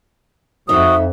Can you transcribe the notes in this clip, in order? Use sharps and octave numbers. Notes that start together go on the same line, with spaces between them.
F2 D#4 F#4 E5 D#6